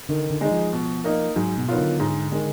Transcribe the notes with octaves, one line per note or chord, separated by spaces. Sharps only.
D3 D#3
D3
G#3 D#4
F3
B2
A#3 D#4
G#2 F#3
B2
D#3 F#3 B3 F4
D3
G#2
D#3 G#3